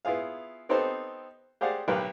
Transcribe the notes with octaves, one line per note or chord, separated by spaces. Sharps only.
B3 E4 F4 G#4 F5
B3 C4 D#4 G4 A4 C5
G4 G#4 C5 D5 F5 F#5
B1 G4 A#4 B4 F5